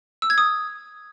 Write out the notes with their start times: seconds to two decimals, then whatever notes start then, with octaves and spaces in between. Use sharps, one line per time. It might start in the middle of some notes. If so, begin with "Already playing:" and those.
0.22 E6
0.30 G#6
0.38 D#6